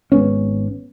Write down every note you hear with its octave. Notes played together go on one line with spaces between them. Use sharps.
G#1 G#3 B3 C#4